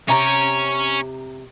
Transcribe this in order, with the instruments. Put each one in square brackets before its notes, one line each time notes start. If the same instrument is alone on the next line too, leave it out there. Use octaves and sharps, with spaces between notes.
[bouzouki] C3 G5 A#5 [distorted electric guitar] C#4 C#5